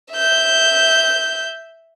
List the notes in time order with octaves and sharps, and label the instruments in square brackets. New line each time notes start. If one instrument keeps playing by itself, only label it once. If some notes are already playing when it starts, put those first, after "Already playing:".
[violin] E5 G6